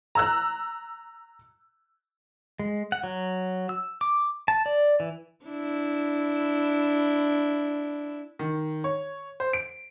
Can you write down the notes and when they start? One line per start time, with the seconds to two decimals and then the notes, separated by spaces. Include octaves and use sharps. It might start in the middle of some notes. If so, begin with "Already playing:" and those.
0.15 A#5 E6 F#6
2.59 G#3
2.92 F#5
3.04 F#3
3.69 E6
4.01 D6
4.48 A5
4.66 D5
5.00 E3
5.45 D4 E4
8.39 D#3
8.84 C#5
9.40 C5
9.53 D7